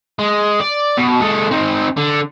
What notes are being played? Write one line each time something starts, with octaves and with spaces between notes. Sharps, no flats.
G#3
D5
B2
G#3 A4
C4 D#4
D3